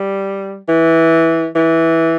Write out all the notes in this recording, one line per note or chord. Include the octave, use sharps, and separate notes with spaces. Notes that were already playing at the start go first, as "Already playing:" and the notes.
Already playing: G3
E3
E3